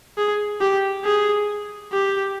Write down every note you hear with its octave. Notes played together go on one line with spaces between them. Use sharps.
G#4
G4
G#4
G4